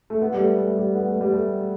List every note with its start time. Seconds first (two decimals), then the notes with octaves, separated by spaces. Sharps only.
0.10 A3
0.22 B3
0.34 G3
0.39 A3
0.59 A3
0.77 G3
0.95 B3
1.08 A3
1.21 G3
1.34 A3